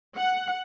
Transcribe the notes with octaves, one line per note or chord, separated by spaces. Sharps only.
F#5